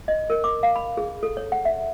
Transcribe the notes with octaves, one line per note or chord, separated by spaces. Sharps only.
D#5
A#4
D6
F5
B5
G#4
A4
C#5
F#5
E5